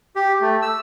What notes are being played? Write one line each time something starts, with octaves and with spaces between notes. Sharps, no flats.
G4
A3
E6